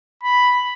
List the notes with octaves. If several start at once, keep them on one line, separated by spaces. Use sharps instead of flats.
B5